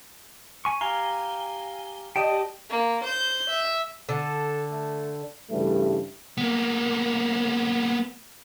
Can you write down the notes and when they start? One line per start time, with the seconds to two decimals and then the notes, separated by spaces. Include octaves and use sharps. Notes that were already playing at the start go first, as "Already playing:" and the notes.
0.65 G#5 C#6
0.81 G4 F5 G#5 A#5 G7
2.16 G4 D5 D#5 G5 A5
2.70 A#3
3.04 C5 G6
3.50 E5
4.09 D3 A4
4.72 A3
5.51 G2 C#3 E3 G3 A3
6.37 A#3 B3